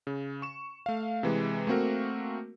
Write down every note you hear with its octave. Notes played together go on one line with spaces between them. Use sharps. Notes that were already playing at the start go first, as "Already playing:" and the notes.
C#3
C#6 E7
A3 F5
C3 E3 G#3
A3 A#3 C4 F#4 A#4